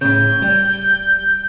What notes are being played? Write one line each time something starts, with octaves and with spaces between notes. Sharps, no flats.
A2 C#3 G6
G3